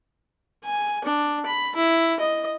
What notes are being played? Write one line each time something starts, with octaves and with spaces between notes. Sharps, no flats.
G#5
D4
B5
E4
D#5